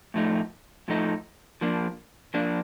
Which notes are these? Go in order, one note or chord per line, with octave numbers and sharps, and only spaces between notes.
A2 F3 A3 D#4
A2 F3 A3 D#4
F3 A#3 D4
F3 A#3 D4